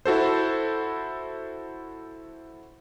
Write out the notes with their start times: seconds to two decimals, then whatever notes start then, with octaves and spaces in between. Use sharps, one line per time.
0.06 E4 F#4 A4 C5